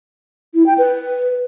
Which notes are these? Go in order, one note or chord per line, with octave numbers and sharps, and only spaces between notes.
E4
G5
B4